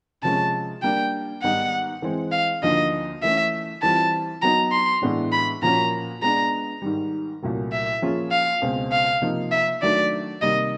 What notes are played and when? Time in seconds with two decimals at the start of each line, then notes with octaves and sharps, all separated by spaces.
0.22 C3 F3 G#3 C#4 A5
0.83 G3 A#3 D4 G5
1.43 G#2 D#3 G3 B3 D#4 F#5
2.02 E3 G#3 C4
2.32 F5
2.62 D2 D3 F3 A#3 D#4 D#5
3.23 E3 A3 C#4 E5
3.82 E3 G3 C4 F4 A5
4.42 F#3 B3 D#4 A#5
4.72 C6
5.02 A2 E3 G#3 B3 D4
5.32 B5
5.62 A#2 F3 A#3 C#4 F#4 A#5
6.22 G#3 B3 D4 A#5
6.82 G#2 D#3 G3
7.43 C2 A#2 F#3 A3
7.73 E5
8.02 F3 A#3 C#4 F4 G#4
8.32 F5
8.62 C#2 B2 G#3 C4
8.92 F5
9.22 C3 F3 A#3 D#4
9.52 E5
9.82 D#3 F#3 A3 D4 D5
10.42 C3 D#3 G3 A#3 D#5